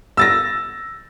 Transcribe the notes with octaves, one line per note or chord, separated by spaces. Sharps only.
E6 A6 A#6